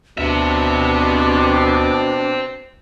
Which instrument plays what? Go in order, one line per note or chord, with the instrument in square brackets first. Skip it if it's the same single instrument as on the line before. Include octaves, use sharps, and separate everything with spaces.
[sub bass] D2 [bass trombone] B2 [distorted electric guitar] C4 E5 [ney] D4